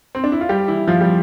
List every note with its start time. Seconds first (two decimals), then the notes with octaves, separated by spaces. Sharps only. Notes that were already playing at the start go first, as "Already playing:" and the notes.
0.15 C4
0.24 D4
0.32 E4
0.41 F4
0.49 G3 G4
0.68 E3 E4
0.88 F3 F4
1.01 G3 G4